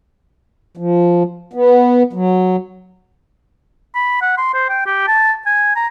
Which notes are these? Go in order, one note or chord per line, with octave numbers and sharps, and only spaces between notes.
F3
B3
F#3
B5
F#5
C6
C5
G5
G4
A5
G#5
A#5